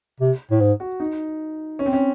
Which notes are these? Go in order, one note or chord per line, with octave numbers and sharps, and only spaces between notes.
C3
A2
G#2
F#4
D#4
C#4
C4
C#4